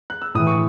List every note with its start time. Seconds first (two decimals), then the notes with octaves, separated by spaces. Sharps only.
0.10 F#6
0.22 E6
0.35 A2 E3 D#6
0.47 C#6